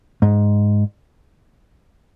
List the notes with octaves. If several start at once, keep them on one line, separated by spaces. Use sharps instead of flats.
G#2